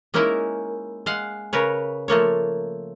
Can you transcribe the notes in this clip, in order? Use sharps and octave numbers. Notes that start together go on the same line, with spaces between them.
G#3 A#3 C#4 D#4 E4 A#4
G#3 F5 F#5
C#3 A#4 B4 C#5
F3 A3 A#3 C#5